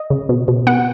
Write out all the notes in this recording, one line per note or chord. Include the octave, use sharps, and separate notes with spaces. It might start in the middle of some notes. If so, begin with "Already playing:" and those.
Already playing: D#5
C#3
B2
B2
B3 F#5